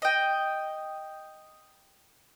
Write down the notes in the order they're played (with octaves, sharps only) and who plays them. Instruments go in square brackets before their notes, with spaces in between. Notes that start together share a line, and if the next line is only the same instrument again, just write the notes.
[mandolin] D#5 G5